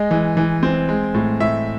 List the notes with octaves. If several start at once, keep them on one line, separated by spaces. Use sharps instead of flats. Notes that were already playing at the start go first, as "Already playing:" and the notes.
Already playing: G#3 D#5
E3
E3
C4
G#3
A2
A2 E5